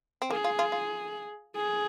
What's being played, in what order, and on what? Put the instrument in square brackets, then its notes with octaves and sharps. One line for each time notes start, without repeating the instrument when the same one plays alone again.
[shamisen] C4
[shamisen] A#3 [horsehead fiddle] G#4
[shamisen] F4
F4
F4
[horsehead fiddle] G#4